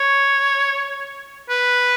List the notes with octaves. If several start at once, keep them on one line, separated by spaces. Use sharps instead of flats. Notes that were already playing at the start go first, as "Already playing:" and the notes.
Already playing: C#5
B4